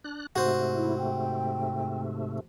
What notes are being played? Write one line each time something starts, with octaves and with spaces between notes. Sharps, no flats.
D4 F#6
G#2 C3 A3 F#4 C5
E4
G5